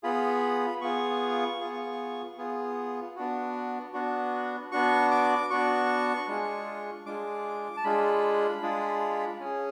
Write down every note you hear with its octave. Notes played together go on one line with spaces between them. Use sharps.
B3 F4 G#4 B5
B3 F4 G#4 C#6
B3 F4 G#4
B3 F4 G#4
B3 D4 F#4
B3 D4 F#4
B3 D4 F#4 C#6
D6
B3 D4 F#4 C#6
G#3 D4 F4 G#4
G#3 D4 F4 G#4 D6
A5
G#3 D4 F4 G#4 B5
G#3 D4 F4 G#4
C#4 G#4